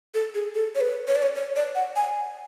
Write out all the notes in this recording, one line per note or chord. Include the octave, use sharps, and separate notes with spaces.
A4
G#4
A4
C#5
B4
C#5
D5
C#5
C#5
D5
F#5
G#5